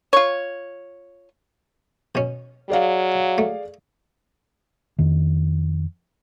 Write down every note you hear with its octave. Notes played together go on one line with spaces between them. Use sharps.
F4 C#5
B2 C#4
F#3 G#4 D5 F5
A3
F2 D#3